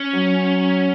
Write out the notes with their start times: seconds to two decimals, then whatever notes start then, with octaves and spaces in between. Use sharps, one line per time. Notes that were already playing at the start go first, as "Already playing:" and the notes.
Already playing: C#4
0.14 F#3